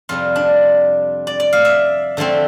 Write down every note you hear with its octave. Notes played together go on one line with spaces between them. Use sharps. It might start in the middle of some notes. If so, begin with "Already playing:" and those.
F2 C3 G3 F4
D4
D5
D5
F5
E5
D3 F3 A3 C4